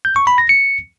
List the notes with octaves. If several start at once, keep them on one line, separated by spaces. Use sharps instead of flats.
G6
C#6
B5
A#6
C#7